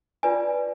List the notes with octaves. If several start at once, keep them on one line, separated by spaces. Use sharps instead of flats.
F4 B4 D5 G#5